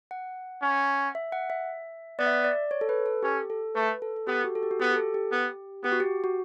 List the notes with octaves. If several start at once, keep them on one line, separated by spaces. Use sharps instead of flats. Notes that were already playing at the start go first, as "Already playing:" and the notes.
F#5
C#4
E5
F#5
E5
B3 D5
E5
D5
D5
C#5
A4
B4
A4
C#4 G4
A4
A3 B4
A4
A4
B3 G4
F#4
A4
G4
F#4
B3 G4
G4
A4
G4
B3
B3 G4
F#4
G4
F#4